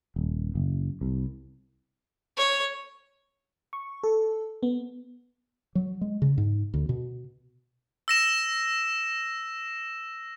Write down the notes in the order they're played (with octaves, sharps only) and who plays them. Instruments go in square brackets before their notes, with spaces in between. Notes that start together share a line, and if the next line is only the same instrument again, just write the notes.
[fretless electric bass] D#1
F#1
C2
[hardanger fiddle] C#5
[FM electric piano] C#6
A4
B3
[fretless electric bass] F#3
G#3
C#3
G#2
D2
B2
[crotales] E6 A#6 E7